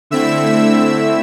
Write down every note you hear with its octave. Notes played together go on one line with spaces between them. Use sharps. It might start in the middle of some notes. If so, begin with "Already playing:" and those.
D3 A3 C4 E4 E5 E6